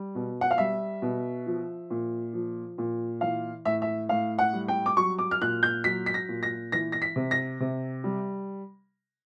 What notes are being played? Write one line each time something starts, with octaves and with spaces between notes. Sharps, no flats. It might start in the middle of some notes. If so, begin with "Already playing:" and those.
Already playing: G3
B2
F#5
F5
G3 E5
B2
F3
A#2
F3
A#2
E3 F5
A2 E5
E5
A2 F5
F#5
G3
G5
D6
F#3 C#6
D6
F6
A#2 F#6
G6
F#3 B6
B6
A#6
A#2
A#6
E3 A#6
A#6
B6
C3
A#6
C3
G3